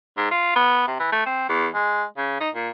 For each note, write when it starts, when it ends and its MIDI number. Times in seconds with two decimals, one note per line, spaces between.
0.17 0.29 44
0.31 0.52 65
0.56 0.85 59
0.87 0.98 48
0.99 1.08 52
1.12 1.23 57
1.26 1.48 60
1.49 1.67 40
1.74 2.03 56
2.17 2.40 49
2.40 2.49 63
2.55 2.70 46